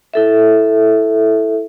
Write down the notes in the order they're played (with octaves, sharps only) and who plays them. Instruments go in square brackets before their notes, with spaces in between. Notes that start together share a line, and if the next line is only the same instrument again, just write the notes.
[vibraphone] E4 A4 E5